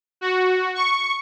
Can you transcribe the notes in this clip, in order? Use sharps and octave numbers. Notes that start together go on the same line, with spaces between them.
F#4
C#6